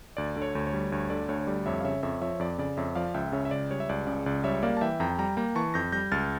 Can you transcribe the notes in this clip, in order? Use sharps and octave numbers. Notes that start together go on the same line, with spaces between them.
D2 D5
D3
C#5
D2
C#5
G3
D2 C#5
D3 D5
D2 C#5
C#5
G3 D5
F2 C#5 E5
F5
C#3 C#5 E5
F2 C#5 E5
F3 C#5 E5
F2 D5
C#3 D5
F2 C#5 E5
F3 D5 F5
C#2 E5 G5
C#3 C#5 E5
E5
C#2 D5
G3 C#5
E5
C#2 D5
C#3 D5
C#2 D5
G3 C#5 E5
A#3 D5 F5
A5
E3 E5 G5
F2 G5 A#5
G3 G5 A#5
A#3 G5 A#5
E3 A5 C#6
F2 G6 A#6
G3 G6 A#6
C#2 F6 A6